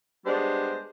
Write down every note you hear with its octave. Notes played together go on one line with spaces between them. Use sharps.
G3 G#3 B3 D4 C5